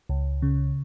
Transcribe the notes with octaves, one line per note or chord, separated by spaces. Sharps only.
C#2
C#3